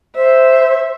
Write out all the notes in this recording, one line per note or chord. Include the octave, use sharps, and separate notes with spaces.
C5 E5